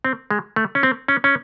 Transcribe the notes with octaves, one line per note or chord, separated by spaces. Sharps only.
C4
G#3
A3
C#4
C4
C#4
C#4